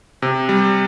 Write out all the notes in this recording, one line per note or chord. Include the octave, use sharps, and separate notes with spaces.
C3
G3